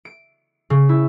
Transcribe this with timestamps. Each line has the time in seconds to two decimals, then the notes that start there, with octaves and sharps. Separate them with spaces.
0.05 D7
0.70 C#3
0.89 E4